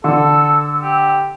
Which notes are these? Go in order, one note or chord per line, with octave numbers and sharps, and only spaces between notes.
D3 A4 E6
G4